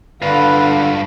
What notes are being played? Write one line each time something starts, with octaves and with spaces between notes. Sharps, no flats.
G2 D3 F4 B4 F5